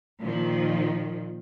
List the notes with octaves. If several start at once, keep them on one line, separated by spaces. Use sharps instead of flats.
A#2 D#3 F3